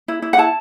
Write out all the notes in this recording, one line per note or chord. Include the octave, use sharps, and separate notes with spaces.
E4
E4
F#5
E4 A5